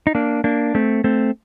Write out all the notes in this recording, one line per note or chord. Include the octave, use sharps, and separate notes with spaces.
D#4
A#3 D4
A#3 D4
A3 C4
A3 C4